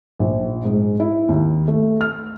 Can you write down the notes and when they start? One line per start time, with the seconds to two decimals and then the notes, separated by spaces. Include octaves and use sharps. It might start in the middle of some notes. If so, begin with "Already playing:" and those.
0.19 A#1
0.65 G#2
1.00 E4
1.29 D#2
1.68 A3
2.01 F6